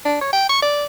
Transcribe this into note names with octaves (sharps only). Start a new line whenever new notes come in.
D4
C#5
G5
C#6
D5